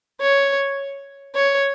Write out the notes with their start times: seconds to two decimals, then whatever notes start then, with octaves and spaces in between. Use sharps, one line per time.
0.20 C#5
1.35 C#5